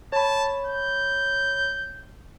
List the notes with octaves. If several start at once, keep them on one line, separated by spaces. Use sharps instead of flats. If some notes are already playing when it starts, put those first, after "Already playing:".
C#5 A5 B5
G6